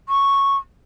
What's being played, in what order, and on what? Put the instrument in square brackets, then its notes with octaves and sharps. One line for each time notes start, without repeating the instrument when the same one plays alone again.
[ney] C#6